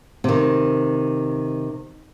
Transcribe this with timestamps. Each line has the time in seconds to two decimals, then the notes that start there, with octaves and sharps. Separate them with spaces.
0.24 C3 D#3